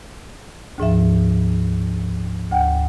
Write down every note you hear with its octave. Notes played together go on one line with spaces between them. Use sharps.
D2 G#2 F3 E5
D2 F#5 G5